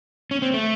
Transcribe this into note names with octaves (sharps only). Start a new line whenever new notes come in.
C#4
C4
A3